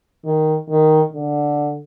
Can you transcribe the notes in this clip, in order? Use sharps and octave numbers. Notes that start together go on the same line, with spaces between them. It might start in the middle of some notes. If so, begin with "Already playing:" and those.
D#3
D#3
D3